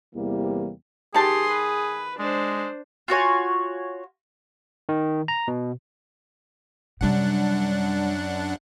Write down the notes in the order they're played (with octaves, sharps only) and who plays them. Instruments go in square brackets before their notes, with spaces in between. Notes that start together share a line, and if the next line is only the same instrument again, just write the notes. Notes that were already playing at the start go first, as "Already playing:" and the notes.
[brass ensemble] E2 C3 E3 G3 A#3
[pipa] D#3 A5 [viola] G4 C6 [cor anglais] G#4
[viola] B4
[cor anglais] G#3 [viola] D4 C5
[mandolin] F4 F#4 C#5 G#5
[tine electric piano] D#3
A#5
B2
[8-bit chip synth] F#2 D4 F#5 [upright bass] C3 G3